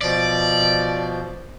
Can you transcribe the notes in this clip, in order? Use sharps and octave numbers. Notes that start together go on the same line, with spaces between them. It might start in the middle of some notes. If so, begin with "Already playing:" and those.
B2 F3 D5